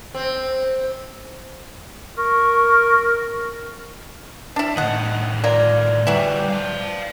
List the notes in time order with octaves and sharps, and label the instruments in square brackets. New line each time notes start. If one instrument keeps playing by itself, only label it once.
[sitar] C4
[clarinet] A#4 [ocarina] C#6
[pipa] D4 E4
[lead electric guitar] A2 D#3 [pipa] D#5 F#5
[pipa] F4 A#4 [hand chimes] D5
[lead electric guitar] D2 G3 [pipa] E3 F#3 E4
[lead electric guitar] F5 A5